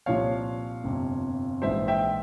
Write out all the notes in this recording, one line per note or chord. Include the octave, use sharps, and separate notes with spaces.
C2 A#2 F3 C#5 F5
G1 F2 C3
A#1 G#2 E3 C5 E5
E5 G5